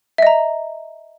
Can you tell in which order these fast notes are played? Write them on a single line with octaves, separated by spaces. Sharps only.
E5 D#5 A#5